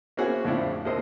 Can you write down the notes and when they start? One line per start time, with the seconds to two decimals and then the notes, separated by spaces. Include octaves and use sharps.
0.17 A#3 C4 C#4 E4 F#4 G#4
0.45 F2 A2 C#3 C4 D4 E4
0.85 A#1 D#2 C3 A#4 C5 D#5